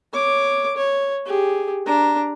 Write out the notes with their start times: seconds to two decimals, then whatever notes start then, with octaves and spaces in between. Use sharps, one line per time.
0.13 C#5 D6
0.77 C#5
1.26 G4 G#4
1.86 D4 A#5